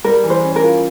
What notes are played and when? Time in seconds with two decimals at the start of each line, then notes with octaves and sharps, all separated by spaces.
0.04 G3 A#4
0.23 E3
0.30 C5
0.44 C#4
0.56 A#4
0.62 F4